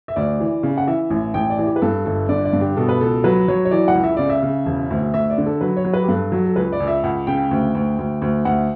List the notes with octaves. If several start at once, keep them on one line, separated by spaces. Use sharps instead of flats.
E5
D2 D5
E3
C#3
F#5
E3 E5
A1
A1 G5
D5
E3
G4
B4
G2 A4
G1 A4
D3 D5
D5
G2
G4
B2 A4
B4
C#2 A4
F#3 B4
F#3 C#5
C#5
E3 D5
F#5
C#2
E5
C#3 D5
E5
C#3
E1
D2
D2 E5
D5
D3
A4
F#3 B4
C#5
F#3
B4
G4
G2 A4
F#3
A4
C#2 B4
D5
C#2
E5
C#2 F#5
C#3 G5
D2
D2
D2
D2
D2 F#5